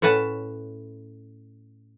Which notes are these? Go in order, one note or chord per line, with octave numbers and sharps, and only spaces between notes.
A2 C#4 B4 F#5 A5